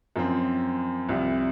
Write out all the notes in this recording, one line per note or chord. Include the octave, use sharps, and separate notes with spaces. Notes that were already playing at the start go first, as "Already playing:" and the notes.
F#2 F3 C4
C2 C3 F3